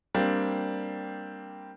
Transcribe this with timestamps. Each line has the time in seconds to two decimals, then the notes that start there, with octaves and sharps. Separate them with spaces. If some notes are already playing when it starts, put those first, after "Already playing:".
0.15 G3 A#3 C4 D4